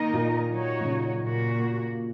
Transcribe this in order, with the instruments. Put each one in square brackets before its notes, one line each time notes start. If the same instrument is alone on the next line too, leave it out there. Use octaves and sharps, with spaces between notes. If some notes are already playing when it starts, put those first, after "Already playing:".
Already playing: [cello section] D#3 A#3 D#4 A#4 D#5
[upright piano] A#2
[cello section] F#3 D#4 F#4 C#5
[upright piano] A#2
C#3
[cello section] A#2 A#3 F#4